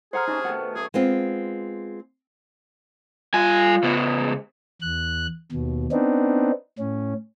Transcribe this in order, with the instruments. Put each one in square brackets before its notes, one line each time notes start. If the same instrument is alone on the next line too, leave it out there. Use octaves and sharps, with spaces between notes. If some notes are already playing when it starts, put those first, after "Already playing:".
[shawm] G#4 [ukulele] A4 F#5 A#5 [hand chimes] C5 F6 [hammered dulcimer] C6
[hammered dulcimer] C3 C#4 A5 [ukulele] D#4
[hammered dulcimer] B2 D#3 A3 [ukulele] F#5
[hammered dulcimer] F#2 A3 [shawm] G#4 [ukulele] B4
[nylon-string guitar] G#3 B3 C4 F4
[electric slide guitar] G3 G#5 [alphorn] F4
[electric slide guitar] C#3 B3
[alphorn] G#3
[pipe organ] E2 F#6
D#2 B2
B3 C4 D4 D#4
A2 C#4